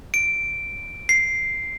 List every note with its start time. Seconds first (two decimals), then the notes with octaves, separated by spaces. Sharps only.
0.14 D7
1.09 C7